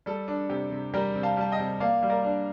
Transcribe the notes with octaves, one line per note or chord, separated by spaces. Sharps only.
G3 A4
D4
C3 G4
C3
G3 G4 A#4
C3
F5 A5
G3 A5
D#5 G5
C3
A#3 D5 F5
G3
A#4 D5
D4